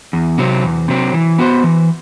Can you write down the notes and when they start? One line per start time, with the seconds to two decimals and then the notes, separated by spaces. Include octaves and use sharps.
0.13 E2
0.38 C3 F#3 C4
0.63 E2
0.88 C3 F#3 C4
1.14 E3
1.38 B3 F#4 C5
1.64 E3